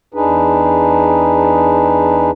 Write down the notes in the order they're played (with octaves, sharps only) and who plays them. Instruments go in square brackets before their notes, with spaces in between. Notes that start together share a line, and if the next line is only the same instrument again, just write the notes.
[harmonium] E2 D4 D#4 G#4 B4